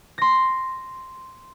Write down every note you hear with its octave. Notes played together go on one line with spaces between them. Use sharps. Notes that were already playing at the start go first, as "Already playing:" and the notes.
C6 A#6